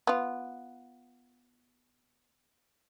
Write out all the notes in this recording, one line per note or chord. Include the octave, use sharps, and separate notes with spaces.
B3 F4